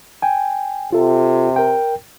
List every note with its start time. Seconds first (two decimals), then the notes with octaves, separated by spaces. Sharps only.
0.22 G5 G#5
0.93 C3 F4 A4
1.56 A#4 G5